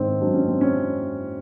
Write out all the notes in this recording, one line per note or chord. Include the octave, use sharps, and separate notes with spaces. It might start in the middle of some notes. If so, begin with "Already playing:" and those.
Already playing: G#2 D#3 C4
F#3 D4
C#4
C4
C#4